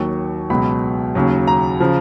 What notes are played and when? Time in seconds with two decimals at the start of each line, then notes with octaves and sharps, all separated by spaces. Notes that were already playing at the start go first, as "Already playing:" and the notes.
Already playing: D#2 D#3 F#3 C#6
0.50 C#2 B2 F#3 B5
1.15 D#2 C#3 F#3
1.47 A#5
1.80 C#3 F3